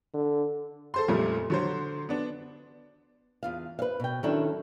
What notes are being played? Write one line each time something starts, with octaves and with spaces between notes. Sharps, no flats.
D3
A4 C5 C6
F2 A#2 C#3 G3 A3
D3 F#3 C5
B3 D4
E2 F4 F5
B4 C5 F5
B2 G5
D#3 F#3 C#4 D4 E4 A4